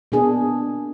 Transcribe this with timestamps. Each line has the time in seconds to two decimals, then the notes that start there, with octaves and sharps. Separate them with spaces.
0.12 B2 A#3 D4 G#4